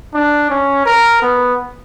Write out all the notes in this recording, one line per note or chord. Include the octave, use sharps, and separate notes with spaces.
D4
C#4
A#4
B3